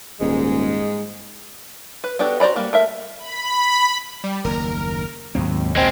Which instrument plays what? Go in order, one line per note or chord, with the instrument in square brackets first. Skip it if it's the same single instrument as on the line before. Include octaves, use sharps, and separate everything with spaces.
[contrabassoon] D#1 [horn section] G#2 G#3
[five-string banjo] B4
B3 D4 F#4 G4 A4
F#4 C5 D5 A#5 B5
G3 A#3 F#4
A3 A#4 E5
[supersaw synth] B5
[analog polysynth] G3
[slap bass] F#1 D#2 [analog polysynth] A#4
[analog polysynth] D#2 [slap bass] G#2 F#3 C4
[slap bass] A#1 [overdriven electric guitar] G#3 C4